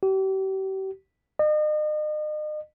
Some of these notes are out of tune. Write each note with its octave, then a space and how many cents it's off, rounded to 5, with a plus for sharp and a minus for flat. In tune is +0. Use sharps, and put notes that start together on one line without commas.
G4 -40
D#5 -40